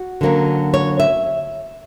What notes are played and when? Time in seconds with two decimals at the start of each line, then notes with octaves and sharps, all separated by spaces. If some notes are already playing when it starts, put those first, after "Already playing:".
Already playing: F#4
0.21 D3 F#3 A#3 C#4
0.74 C#5
1.00 E5